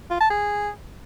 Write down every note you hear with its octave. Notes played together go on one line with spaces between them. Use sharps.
F4
A5
G#4